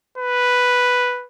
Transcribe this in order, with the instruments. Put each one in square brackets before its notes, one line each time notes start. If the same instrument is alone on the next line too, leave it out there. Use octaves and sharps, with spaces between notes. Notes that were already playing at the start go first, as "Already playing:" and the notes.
[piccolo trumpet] B4